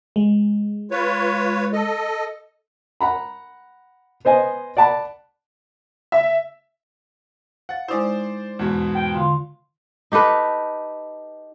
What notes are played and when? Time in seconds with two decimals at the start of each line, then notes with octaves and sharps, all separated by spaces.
0.16 G#3
0.91 F4 B4 C#5
1.73 A4 D#5
3.01 F#5 A#5 B5
4.25 B3 C5 D#5 G#5
4.77 D5 F#5 A5 B5
6.12 E5
7.69 F5 F#5 A6
7.88 G#3 D#4 E4 C5 D5
8.59 E2 G#2 B2
8.95 G5
9.15 D3 F4
10.12 D#4 G4 A4 B4